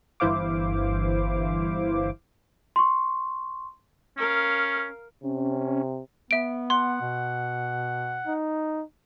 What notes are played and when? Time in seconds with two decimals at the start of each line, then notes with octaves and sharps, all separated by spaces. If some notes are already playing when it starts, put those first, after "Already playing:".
0.20 G1 E3 E4 C5 F5 D6
2.76 C6 C#6
4.18 C#4 A#4 F5
5.24 C3 C#4
6.31 B3 E5 D7
6.70 F#5 C6
7.01 B2
8.27 D#4